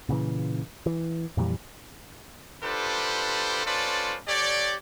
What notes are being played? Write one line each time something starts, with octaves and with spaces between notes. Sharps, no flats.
A#2 C#3 E3
E3
F2 A#2 E3 G3
D4 F4 G4 A4 B4 C5
C#4 F4 A4 B4 C5 D5
G4 A4 C#5 D5